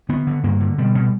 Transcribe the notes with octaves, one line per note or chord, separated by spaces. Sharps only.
D3 B3
D3
G2 A#3
D3
B2 G3
B2